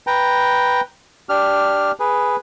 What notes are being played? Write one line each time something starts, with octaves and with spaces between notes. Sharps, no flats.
B4 G5 A#5
D4 G4 F6
G#4 B4